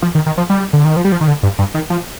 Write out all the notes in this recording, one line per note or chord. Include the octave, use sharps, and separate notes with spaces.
F3
D#3
D#3
F3
G3
D3
D#3
F3
G3
F3
D#3
D3
G2
G2
D#3
F3